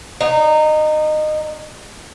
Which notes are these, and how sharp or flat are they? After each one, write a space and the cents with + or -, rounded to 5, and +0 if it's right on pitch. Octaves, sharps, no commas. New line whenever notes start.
D#4 -20